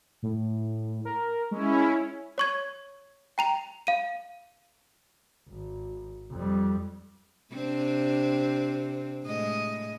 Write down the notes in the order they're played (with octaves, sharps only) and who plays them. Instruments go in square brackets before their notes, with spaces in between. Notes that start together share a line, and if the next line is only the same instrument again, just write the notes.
[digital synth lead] A2
A#4
[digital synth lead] G#3 [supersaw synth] C#4 E4
[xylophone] C#5 C#6 G#6
G5 A#5 F7
F5 D#7
[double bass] G#1
F2 G3
[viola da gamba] C3 C4 D4
A2 G#3 D#5